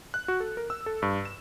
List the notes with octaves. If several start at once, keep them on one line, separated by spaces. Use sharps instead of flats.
F#6
F#4
A4
A#4
E6
A4
G2
E7